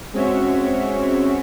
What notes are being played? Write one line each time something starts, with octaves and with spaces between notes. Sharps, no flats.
G#3 C4 C#4 F#4 C#5 E5